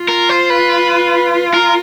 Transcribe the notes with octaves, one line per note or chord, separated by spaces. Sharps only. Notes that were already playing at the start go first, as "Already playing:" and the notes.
Already playing: F4
A#4
C5
B4
A#4